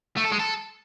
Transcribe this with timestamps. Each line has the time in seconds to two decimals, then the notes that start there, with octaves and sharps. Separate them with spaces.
0.17 A3
0.24 A4
0.32 G#3
0.39 A4